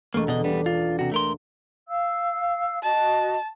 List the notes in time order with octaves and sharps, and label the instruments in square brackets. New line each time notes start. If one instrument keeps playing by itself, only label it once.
[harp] E1 A4 [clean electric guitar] A3 A#3
[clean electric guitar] B2 D3 D#5
[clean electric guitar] G3 B3 [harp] D4
[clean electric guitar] F4
C3 F#4
A3 A#4 C6
[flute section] F5 E6
[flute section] F#4 D#5 [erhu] A5